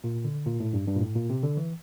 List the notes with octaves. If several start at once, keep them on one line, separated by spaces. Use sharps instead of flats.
A#2
D3
A#2
A2
G2
G2
A#2
A2
A#2
C3
D3
E3